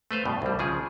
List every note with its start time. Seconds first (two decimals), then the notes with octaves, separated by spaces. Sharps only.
0.11 A3 B4 C5 F5
0.25 G2 B2
0.42 C2 G3
0.59 C#3 F3 G#4